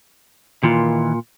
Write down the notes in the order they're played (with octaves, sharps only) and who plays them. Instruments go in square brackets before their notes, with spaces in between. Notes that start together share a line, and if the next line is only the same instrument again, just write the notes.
[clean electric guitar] A#2 [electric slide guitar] D#3 E3 F4